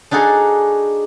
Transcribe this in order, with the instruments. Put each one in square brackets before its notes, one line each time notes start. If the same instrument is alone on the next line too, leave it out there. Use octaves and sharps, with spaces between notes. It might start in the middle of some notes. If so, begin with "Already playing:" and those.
[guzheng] D4 D#4 F#4 G#4 A4